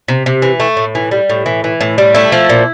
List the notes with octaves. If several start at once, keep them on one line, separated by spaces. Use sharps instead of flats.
C3
C3
E3
A3
A2
E3
G3
A2
E3
E3
A2
G3
A3 E4
F3
A#2